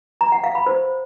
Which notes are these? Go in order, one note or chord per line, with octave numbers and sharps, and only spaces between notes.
A#5
F#5
F5
B5
C5